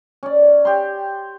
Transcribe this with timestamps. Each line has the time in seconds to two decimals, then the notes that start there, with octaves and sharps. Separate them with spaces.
0.23 C#4 D5
0.65 G4 C6